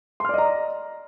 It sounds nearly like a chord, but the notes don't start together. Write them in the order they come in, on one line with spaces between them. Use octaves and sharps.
C6 F6 D5 D#5 A#5